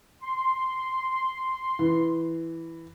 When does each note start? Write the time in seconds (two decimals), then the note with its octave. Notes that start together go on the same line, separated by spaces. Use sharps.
0.23 C6
1.79 E3